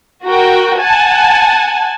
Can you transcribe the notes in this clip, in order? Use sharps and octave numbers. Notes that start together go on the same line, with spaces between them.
F#4 A#4 G5
F#5 G#5 A5